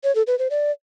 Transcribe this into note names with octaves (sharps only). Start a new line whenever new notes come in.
C#5
A4
B4
C5
D5